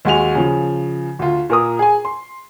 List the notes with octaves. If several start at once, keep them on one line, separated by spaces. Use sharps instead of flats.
D#2 G#3 F#4 G#5 F7
C#3 F3
D2 F4
A#2 A#4 D#6
G#4 G#5
C6